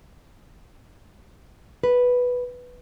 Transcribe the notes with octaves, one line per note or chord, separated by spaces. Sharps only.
B4